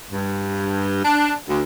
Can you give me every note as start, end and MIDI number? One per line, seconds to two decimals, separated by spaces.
0.11 1.00 43
1.05 1.33 62
1.49 1.62 38